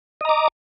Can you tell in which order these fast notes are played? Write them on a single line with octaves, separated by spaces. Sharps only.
D#5 A#5 D6